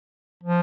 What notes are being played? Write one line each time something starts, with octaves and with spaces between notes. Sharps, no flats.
F3